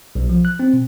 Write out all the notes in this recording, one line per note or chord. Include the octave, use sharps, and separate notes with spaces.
B1
F3
F#6
C4
B2